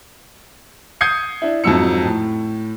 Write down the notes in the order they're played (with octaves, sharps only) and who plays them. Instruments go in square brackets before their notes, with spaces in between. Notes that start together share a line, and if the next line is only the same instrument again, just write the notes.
[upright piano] D#6 G6 G#6 C7 C#7
D4 E4
F2 G#2 F#3 E6 C#7
A2